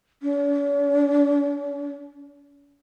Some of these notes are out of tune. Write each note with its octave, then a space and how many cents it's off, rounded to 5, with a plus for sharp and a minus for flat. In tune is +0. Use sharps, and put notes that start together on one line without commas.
C#4 +45